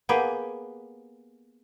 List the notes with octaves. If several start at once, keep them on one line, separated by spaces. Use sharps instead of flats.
A#3 B3 G4 G#4